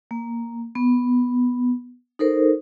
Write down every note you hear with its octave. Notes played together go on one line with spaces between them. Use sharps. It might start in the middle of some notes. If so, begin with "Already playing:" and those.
A#3
B3
D#4 A4 A#4 C5